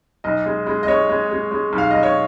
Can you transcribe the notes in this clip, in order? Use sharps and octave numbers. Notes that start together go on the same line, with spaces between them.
B1 D#5
G#3
G#3
D#5
G#3 C#5
G#3
G#3
G#3
B1
F5
B1 D#5
C#5